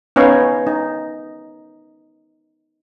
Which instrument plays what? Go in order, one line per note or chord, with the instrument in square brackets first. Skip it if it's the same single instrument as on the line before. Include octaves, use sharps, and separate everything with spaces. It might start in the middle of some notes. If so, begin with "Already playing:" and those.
[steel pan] B3 C#4 D#4 C#5 F5
D#4